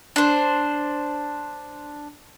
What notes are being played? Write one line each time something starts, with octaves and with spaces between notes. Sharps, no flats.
D4 C5